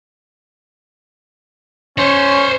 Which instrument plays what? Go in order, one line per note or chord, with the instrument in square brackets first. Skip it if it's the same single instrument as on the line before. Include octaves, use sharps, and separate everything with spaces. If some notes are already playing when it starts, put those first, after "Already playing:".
[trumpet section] C#4 [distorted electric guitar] C5 C#5